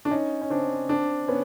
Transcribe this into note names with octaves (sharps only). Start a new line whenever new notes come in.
D4
C#4 D#4
C#4
C4 D4
C4 D4
B3 C#4